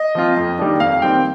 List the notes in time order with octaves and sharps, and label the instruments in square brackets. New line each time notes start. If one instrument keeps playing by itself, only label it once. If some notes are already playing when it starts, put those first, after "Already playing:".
Already playing: [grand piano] D#5
F3 C4 F4
F2
D#3 G3 A#3 D4
F2 F5
D#3 G3 C4 G5